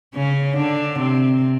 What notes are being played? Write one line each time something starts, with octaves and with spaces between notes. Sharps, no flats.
C#3 C#4
D3 D4
C3 C4